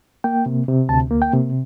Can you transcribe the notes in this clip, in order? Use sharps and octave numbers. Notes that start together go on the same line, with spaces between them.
A#3 G5
C3
C3
D2 A5
A#3
G5
C3